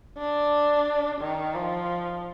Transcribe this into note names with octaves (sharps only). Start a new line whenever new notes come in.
D4
D#3
F3